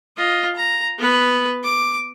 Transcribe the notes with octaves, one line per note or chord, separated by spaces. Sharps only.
F4 D#5
A#5
B3 B4
D6